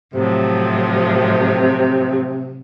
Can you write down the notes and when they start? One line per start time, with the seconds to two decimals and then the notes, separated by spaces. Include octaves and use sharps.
0.14 A2 C3 F3 F#3